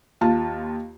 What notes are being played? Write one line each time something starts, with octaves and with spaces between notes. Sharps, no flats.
D#2 F4 A5